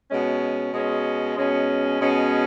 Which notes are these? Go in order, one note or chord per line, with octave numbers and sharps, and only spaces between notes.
B2 G#3 C#4
B2 G#3 C#4
B2 G#3 C#4
B2 G#3 C#4